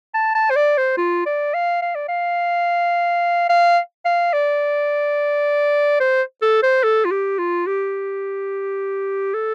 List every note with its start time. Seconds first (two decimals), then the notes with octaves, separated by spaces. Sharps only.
0.14 A5
0.35 A5
0.50 C5
0.56 D5
0.78 C5
0.97 F4
1.26 D5
1.54 F5
1.82 F5
1.95 D5
2.08 F5
3.49 F5
4.05 F5
4.33 D5
6.00 C5
6.42 A4
6.63 C5
6.84 A4
7.05 F4
7.11 G4
7.39 F4
7.67 G4
9.34 A4